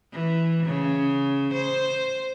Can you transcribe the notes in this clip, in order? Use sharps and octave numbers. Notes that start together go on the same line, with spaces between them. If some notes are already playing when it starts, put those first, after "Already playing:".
E3
C#3
C5